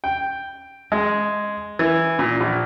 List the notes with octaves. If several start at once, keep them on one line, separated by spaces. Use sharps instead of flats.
G5
G#3
E3
A#2
A#1